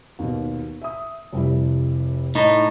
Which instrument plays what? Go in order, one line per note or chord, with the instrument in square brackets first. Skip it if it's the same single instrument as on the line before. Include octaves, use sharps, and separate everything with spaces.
[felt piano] D#2 B2
E5 D#6
F1 G3 E4
[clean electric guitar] A2 D#4